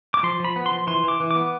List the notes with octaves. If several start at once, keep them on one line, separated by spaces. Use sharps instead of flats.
D6
F3 C6
F3 B5
B3
C6
F3
E3 C6
E3 D6
E3
D6
B3